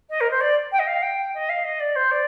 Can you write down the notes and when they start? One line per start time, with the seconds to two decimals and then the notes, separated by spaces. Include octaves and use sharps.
0.09 D#5
0.20 A#4
0.31 C5
0.40 D5
0.72 G5
0.79 D#5
0.87 F5
1.02 G5
1.34 D#5
1.49 F5
1.64 D#5
1.80 D5
1.95 C5
2.11 D5